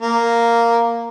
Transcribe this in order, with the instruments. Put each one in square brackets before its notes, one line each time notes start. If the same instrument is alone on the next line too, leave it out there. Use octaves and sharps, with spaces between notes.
[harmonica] A#3